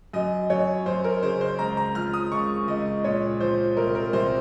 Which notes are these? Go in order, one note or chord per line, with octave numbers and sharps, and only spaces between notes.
F#2 D#5
F#2 C#5
F#2 C5
A#4
C#3 C5
C5
C#2 A#5
A#5
F3 F6
D#6
C#2 C#6
C#2 D#5
A#2 C#5
F3 C5
C2 A#4
A#4
C2 C5